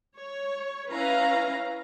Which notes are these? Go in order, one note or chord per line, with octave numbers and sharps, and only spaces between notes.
C#5
C#4 E4 B4 F5 A#5